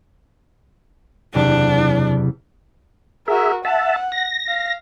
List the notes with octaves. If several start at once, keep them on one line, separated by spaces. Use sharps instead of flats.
F#1 E2 C3 D4
F#4 G#4 A#4 E5
E5 F#5 A5
A#6
F5